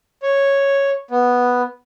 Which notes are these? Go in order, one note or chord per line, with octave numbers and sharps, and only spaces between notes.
C#5
B3